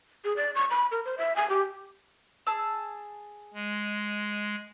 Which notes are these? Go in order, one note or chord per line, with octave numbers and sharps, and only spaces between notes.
G#4
D5
C#6
B5
A#4
C5
E5
G#5
G4
G#4 A5 E6
G#3